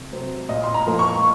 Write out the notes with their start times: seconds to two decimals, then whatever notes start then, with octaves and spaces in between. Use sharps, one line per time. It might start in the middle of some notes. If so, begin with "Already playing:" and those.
Already playing: C3
0.12 F#3 C4
0.49 A#2 D#5
0.64 C6
0.74 A#5
0.87 F3 A#3
0.99 C#6